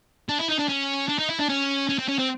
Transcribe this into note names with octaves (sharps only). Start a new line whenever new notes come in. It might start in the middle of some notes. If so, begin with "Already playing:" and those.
D4
E4
D#4
D4
C#4
D4
D#4
E4
D4
C#4
C#4
C4
C#4
C4